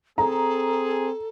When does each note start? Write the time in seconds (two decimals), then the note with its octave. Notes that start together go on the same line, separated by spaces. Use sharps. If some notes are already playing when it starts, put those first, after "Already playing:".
0.18 C4 G#4 A4 A#5